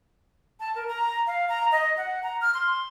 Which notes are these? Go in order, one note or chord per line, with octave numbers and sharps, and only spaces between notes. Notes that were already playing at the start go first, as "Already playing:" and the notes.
A5
A#4
A#5
F5
A#5
D#5
F#5
A#5
F6
C6